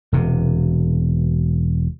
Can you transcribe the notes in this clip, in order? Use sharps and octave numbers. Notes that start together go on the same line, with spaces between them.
E1 C3